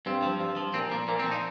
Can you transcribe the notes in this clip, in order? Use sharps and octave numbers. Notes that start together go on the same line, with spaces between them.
G2 C4
F3
G2
F3
A#2 C4
F3 A#3
A#2 A#3
C4
F3
D#4